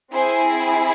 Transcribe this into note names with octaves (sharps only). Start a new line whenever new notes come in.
C4 E4 G#4 C5